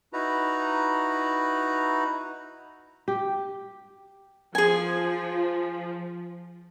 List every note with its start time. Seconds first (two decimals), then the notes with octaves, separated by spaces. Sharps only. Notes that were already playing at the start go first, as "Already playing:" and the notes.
0.13 D#4 E4 F#4 B4 A#5
3.08 G4
4.55 F3 G#4 G#5